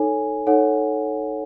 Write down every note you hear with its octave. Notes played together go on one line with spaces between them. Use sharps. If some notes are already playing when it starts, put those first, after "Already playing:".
Already playing: D#4 A4 C#5 G#5
D#4 A4 C#5 F#5